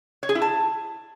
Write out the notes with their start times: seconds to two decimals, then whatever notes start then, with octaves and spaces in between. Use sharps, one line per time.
0.23 C#5
0.29 G#4
0.35 E4
0.42 A5